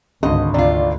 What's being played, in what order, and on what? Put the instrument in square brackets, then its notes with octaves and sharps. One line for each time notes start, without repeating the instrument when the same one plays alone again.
[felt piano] G#1 D3 [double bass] C#2 G#2 [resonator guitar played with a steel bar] D#5
[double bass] D2 [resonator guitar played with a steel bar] C3 F4 [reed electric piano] D5